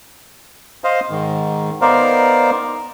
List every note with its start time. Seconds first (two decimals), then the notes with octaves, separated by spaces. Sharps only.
0.84 C5 D#5 F5
1.10 G#2 D#3
1.81 B3 D#4 A#4 C5 D5 F5